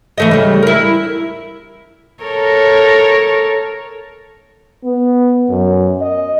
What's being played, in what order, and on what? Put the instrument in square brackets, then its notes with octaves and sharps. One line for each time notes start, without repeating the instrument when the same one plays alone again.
[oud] E3 A3 D#5
C#3 G3
E4 A#4
[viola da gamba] A4 A#4 C#5
[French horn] B3
F#2
D#5